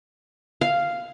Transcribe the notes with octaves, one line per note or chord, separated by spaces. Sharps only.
F5